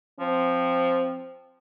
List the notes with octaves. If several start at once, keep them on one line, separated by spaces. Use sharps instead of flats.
F3 C4